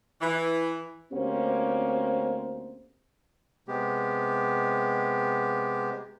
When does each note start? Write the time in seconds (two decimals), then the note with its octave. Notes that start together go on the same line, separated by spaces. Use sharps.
0.20 E3
1.13 D2 A#3 C4 C#4 G4 C5
3.68 C3 G#3 B3 G4